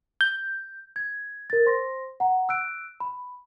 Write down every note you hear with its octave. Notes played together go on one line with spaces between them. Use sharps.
G6
G#6
A#4 A6
C5 C6 A#6
F#5 A#5
E6 F#6 D7
B5